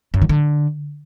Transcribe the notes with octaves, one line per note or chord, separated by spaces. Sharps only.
F#2
D#3
D3